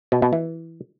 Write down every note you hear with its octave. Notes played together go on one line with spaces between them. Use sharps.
B2
B2
E3